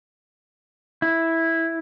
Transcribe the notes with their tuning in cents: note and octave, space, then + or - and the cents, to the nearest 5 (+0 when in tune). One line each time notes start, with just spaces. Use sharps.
E4 -5